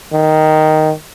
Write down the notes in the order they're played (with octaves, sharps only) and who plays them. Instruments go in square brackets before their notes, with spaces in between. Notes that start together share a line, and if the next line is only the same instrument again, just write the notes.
[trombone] D#3